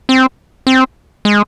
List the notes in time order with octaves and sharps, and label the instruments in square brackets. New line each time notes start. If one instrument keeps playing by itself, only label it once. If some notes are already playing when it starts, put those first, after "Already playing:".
[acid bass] C4
C4
G#3